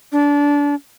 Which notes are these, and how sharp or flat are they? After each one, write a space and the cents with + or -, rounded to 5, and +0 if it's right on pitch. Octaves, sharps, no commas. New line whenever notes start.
D4 -25